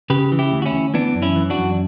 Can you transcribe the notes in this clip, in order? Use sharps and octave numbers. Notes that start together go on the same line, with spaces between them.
C#3 G4 B4
E3
E4 G4
D2
F#4
C#4 E4
D2
E3 B3 D4
F#2
C#4 E4
E3
D4 F#4
F#2